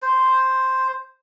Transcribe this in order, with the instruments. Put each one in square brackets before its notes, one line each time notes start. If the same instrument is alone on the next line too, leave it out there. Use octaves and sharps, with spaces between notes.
[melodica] C5